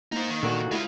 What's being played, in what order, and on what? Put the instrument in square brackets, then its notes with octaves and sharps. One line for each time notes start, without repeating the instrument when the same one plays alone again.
[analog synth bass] A#3 [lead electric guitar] D#4 C5
[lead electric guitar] D#3
[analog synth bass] A#2 [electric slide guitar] D3 A#3 F#4
[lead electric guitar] G#3 F4 [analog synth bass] E4